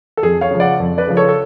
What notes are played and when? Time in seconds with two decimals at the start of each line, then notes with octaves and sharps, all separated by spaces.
0.17 A4
0.22 F2 G#4
0.41 C#5 F5
0.51 C#3 F3
0.60 D5 F#5
0.80 F2
0.98 B4 D5
1.07 C#3 F3
1.17 A4 C#5
1.29 A4